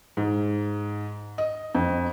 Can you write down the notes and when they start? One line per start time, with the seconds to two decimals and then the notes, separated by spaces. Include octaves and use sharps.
0.17 G#2
1.38 D#5
1.75 F2